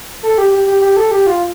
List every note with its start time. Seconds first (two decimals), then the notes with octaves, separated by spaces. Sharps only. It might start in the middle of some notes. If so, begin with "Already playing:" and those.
0.23 A4
0.38 G4
0.52 G4
0.67 G4
0.82 G4
0.96 A4
1.11 G4
1.27 F4